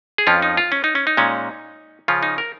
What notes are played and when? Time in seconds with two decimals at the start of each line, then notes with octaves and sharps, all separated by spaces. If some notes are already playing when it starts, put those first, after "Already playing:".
0.18 G#4
0.27 F2 F3 C#4 F4
0.42 D#4
0.57 F4
0.72 C#4
0.84 D#4
0.95 C#4
1.07 D#4
1.17 A#2 G#3 C#4
2.08 C#3 F3 C#4 F4
2.23 D#4
2.38 A#4